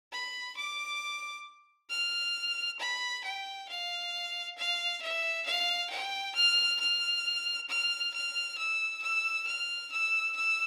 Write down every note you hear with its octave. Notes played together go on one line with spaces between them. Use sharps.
B5
D6
F6
B5
G5
F5
F5
E5
F5
G5
F6
F6
F6
F6
E6
E6
F6
E6
E6